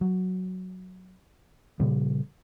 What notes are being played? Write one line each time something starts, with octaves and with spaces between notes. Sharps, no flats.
F#3
A#2 C#3 F3 G3